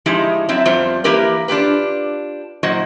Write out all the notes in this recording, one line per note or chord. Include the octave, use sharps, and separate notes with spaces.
A2 F3 G#3 D#4 E4 G4
F#2 F#3 C4 E4 E5
F2 G3 B3 F4 C5
E3 A#3 E4 G4 A#4 B4
D4 F4 G4 B4
A#2 F#3 E4 F#4 C5 D#5